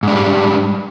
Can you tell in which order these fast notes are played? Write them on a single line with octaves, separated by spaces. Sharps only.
G#2 D4 G3